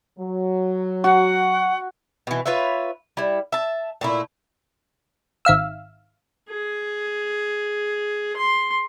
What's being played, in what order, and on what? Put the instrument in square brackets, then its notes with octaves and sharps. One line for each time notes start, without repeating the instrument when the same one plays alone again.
[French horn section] F#3
[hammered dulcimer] F#4 [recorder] F#5
[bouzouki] B2 E3
F4 B4 C#5 E5
G3 E4
E5 A5
A#2 A3 E4
[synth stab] G#1 E5 F5 E6
[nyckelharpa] G#4
C6